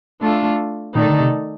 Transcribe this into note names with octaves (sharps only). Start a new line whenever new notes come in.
A3 D4 F4 A4
A#2 D#3 A3 D#4 A4 D5
D3
C3